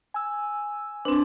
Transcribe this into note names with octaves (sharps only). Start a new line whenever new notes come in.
G#5 E6
C4 D4 B4 C5